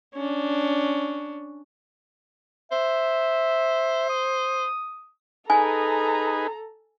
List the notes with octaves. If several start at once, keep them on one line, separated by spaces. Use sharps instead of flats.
C#4 D4
C5 E5
D#6
D#4 G#4 A4 B4 G#5 A#5